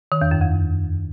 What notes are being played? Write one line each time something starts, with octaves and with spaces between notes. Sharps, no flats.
D#3
E2
F#2
F2